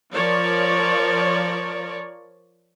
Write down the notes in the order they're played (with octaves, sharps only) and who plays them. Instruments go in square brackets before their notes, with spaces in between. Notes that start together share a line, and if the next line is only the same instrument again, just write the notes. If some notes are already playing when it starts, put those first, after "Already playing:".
[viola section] F3 A#4 C#5 D5